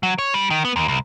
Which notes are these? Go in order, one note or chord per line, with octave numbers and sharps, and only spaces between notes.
F#3
C#5
G3
D#3
B3
D#2
C2